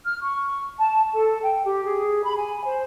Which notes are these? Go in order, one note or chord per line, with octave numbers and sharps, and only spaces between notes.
F6
C#6
A5
A4
G5
G4
G#4
B5
G#5
C5